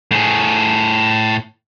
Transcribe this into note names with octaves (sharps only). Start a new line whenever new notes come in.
A2 G#4